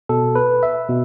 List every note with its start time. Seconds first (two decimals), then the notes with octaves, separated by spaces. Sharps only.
0.09 B2 A4
0.35 B4
0.63 E5
0.89 B2